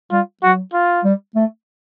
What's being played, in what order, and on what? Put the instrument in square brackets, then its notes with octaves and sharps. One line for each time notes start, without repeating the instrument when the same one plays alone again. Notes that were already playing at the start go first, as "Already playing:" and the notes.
[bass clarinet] G3 [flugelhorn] F4
[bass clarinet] F#3 [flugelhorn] F#4
[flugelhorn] F4
[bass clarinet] G3
A3